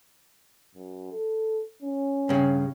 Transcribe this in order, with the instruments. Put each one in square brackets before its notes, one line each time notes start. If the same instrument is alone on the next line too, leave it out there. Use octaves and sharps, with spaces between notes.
[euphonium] F#2
A4
C#4
[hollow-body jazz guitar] G2 C#3